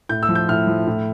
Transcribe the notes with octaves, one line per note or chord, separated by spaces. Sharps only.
A2 G6
E6
F3
G6
A2 F6
F3
A2